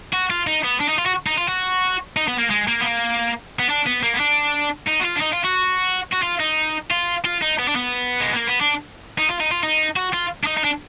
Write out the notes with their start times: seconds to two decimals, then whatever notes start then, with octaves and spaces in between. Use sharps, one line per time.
0.13 F#4
0.30 F4
0.47 D#4
0.64 B3
0.80 D4
0.89 D#4
0.98 F4
1.06 F#4
1.26 D#4
1.38 F4
1.48 F#4
2.17 D#4
2.28 B3
2.38 A#3
2.50 G#3
2.68 A#3
2.80 B3
2.84 A#3
3.59 B3
3.69 D4
3.86 B3
4.03 A#3
4.14 B3
4.20 D4
4.88 D#4
5.01 F#4
5.05 F4
5.16 D4
5.22 D#4
5.33 F4
5.44 F#4
6.13 F#4
6.23 F4
6.40 D#4
6.91 F4
7.25 F4
7.42 D#4
7.59 B3
7.69 D4
7.76 B3
8.21 G#3
8.35 A#3
8.47 B3
8.61 D4
9.18 D#4
9.29 F4
9.40 D#4
9.51 F4
9.63 D#4
9.96 F#4
10.14 F4
10.44 D4
10.47 D#4
10.57 D#4
10.64 D4